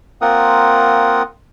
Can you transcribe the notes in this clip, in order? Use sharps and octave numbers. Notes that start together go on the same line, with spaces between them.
A#3 C4 F4 A#4 F#5 D#6